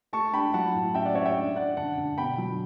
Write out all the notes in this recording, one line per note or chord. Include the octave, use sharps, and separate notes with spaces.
A3 A5 C#6
D4 G5 B5
F#3 F#5 A5
A2
C#4 E5 G5
D5 F#5
C#4 C#5 E5
E5 G5
D4 D5
D4 D5 F#5
D3 F#5 A5
D3
B2 G5 B5
F#3